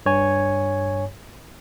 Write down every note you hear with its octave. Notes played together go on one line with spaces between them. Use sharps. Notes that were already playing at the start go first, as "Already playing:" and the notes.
G2 C#5 G#5